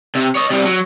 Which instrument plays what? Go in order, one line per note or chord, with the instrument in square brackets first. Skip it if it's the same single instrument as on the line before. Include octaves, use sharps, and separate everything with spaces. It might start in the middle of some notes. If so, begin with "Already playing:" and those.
[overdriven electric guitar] C3
C#5 D#5
C3 G3
F#3